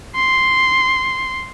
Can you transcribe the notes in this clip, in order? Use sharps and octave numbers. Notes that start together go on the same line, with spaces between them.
C6